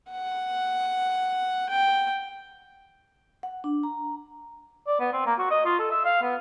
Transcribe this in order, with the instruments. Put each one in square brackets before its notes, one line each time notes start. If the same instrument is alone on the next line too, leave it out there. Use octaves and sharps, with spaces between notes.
[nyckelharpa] F#5
G5
[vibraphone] F#5
D4
A#5
[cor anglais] D5
B3
C4
A#3
F#4
D#5
F4
A4
E5
F5
B3